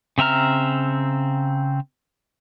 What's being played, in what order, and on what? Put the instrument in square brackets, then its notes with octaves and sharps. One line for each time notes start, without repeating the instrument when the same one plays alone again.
[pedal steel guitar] C#3 C4 E5 A#5 F6